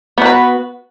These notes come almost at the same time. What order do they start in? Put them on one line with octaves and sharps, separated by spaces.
B3 F#4 B4